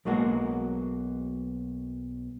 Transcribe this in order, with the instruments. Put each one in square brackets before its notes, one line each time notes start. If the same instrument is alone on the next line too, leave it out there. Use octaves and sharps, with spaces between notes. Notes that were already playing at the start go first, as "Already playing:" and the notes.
[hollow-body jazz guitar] B1 F#3 G#3 A#3 F#4